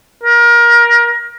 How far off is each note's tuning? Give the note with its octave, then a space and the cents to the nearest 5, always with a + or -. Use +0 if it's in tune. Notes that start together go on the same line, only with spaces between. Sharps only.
A#4 +25